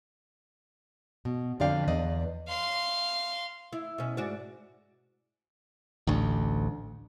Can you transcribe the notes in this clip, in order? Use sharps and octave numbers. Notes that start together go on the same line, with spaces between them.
B2
F2 D3 D5 F5 G5
E2 B4 D5 D#5
F5 C6
E4
B2 C#4
G#2 F#4 D5
A1 D2